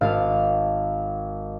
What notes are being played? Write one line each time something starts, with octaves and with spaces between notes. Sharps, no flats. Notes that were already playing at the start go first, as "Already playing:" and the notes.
G#1 F5 F6 A6